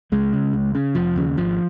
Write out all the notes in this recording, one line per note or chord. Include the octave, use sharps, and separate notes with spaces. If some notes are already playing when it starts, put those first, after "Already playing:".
C#2 G#3
C#3
C#2
C#3
F1 F3
D#2 C#3
G#1 F3